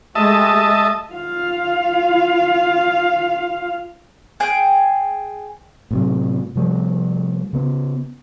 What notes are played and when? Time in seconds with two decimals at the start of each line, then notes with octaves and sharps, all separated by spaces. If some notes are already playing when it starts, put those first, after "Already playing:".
0.15 G#3 A3 G4 D#5 E5 A5
1.12 F4 F5
4.40 G#4 G5
5.91 A2 C3 F#3
6.55 C3 F3 G3 A3
7.53 C#3 B3